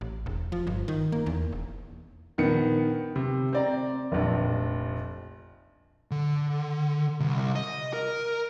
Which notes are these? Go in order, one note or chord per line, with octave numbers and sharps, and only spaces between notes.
A1
E1
F3
G1
D#3
A#3
E2
E1
A#1 D#3 B3 C#7
C3
C4 D5 A#5
F1 A#1
D3
C2
D#5
A#4